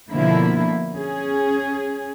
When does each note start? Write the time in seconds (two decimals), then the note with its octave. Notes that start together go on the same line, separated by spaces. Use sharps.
0.10 B2 D3 F3 A#3 E4
0.93 C#4 G#4